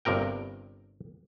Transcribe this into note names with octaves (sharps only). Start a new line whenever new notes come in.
G1 G2 C3 A#4 G5